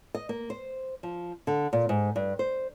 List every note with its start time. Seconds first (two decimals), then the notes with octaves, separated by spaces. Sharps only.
0.15 D#5
0.29 A#3
0.50 C5
1.03 F3
1.47 D3
1.73 A#2
1.89 G#2
2.16 G2
2.39 C5